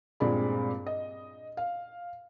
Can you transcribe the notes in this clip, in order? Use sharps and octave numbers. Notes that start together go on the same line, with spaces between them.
G2 A#2 G#3 C4 D5 B5
D#5
F5